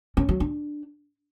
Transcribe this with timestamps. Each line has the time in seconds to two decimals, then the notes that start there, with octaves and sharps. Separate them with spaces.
0.17 C#4
0.29 F#3
0.40 D4